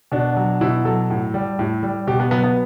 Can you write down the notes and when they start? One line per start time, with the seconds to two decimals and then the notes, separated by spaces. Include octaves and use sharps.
0.12 B2 D4
0.37 F#3
0.61 B2 E4
0.85 F#3 A4
1.10 A2
1.34 G3
1.59 A2
1.83 G3
2.07 B2 G4
2.20 B3
2.31 F#3 B3
2.44 B3